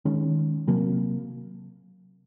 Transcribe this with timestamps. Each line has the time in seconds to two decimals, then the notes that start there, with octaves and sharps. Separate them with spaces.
0.05 D#3 G#3 C#4
0.67 C3 F#3 A#3